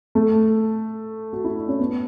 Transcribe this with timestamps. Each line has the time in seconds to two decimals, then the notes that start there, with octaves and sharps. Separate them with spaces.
0.15 A3
1.33 F#4
1.44 E4
1.56 D4
1.68 C#4
1.79 B3